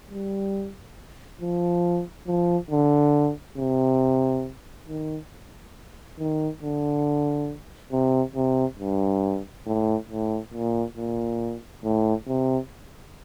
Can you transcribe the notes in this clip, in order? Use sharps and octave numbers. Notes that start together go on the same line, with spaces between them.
G3
F3
F3
D3
C3
D#3
D#3
D3
C3
C3
G2
A2
A2
A#2
A#2
A2
C3